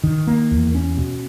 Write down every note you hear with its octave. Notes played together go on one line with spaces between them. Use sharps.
D#3
A#3
E2
C#4
B2